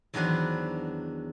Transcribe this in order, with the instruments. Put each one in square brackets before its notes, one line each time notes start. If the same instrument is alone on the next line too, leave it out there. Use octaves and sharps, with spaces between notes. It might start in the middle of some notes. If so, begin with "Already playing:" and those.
[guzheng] E2 D#3 F#3 D4 B4 C5